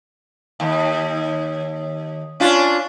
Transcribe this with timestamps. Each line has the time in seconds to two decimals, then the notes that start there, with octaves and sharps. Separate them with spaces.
0.60 D#2
2.40 C#4 D4 F4